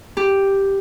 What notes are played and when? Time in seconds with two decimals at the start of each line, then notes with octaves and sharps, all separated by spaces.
0.17 G4